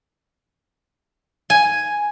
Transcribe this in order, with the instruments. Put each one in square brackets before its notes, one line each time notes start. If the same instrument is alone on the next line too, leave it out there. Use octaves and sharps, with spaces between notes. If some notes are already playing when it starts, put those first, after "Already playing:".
[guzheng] G#5